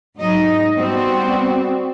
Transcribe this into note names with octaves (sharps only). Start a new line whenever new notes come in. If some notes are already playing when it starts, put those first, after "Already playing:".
G#2 F#3 D#4 D#5
G3 B3 C4 F#4 D5